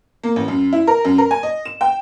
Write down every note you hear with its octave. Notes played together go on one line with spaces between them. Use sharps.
A#3
A1
F#2
E4
A#4
F#2
A#4
G#5
D#5
E7
G5